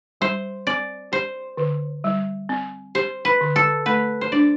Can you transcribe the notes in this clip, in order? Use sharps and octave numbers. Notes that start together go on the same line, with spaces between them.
G3 C5
C4 D5
G4 C5
D3
G3
C4
G4 C5
B4
D3
A4
A3 B4
C5
D4 D5